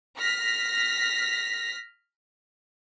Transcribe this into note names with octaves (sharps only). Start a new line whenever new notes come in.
F6 A#6 B6